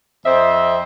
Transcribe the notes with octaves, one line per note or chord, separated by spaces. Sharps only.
F2 C4 C5 D#5 E5